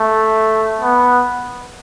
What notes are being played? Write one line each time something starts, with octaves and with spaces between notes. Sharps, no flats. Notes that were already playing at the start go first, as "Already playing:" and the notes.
Already playing: A3
B3